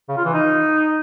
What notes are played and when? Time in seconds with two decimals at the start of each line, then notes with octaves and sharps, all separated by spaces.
0.09 C#3
0.17 F4
0.25 E3
0.33 D#4